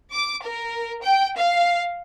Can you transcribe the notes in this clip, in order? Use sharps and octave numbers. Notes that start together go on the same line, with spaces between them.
D6
A#4
G5
F5